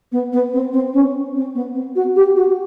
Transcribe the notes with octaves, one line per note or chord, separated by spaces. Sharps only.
B3
B3
C4
C4
C#4
C4
B3
C4
F#4
G4
F#4